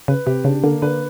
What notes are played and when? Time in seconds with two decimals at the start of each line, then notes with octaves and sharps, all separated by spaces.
0.08 C#3 B4
0.26 C3 G4
0.45 C#3 D4
0.64 D3 A#3
0.82 D3 B4